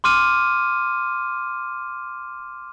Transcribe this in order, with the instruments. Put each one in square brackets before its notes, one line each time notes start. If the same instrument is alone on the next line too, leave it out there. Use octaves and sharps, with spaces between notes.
[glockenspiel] C6 D6 F6 D#7